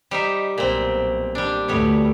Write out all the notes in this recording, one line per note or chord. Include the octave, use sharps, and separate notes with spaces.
G3 D#4 E5
B1 A#2 C4
G3 D4
D2 G3 A3 B3 C#5